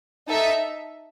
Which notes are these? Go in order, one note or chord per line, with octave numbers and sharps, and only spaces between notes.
D#4 A4 E5